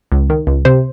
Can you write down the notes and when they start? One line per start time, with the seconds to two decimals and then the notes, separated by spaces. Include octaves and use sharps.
0.12 C#2
0.30 D#3
0.47 C#2
0.65 C3 C5